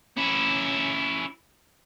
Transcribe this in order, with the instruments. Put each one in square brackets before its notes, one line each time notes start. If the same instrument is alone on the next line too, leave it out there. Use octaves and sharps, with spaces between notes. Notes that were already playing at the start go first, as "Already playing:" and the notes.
[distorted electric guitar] C#4 E4